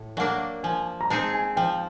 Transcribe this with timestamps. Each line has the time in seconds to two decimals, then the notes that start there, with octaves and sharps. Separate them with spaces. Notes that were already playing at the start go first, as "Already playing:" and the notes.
Already playing: A2
0.17 F#3 A#3 D4 F#5
0.63 F3 G#5
1.01 A#5
1.10 G#3 C4 D#4 G#4 A5
1.34 G#5
1.57 F3 G5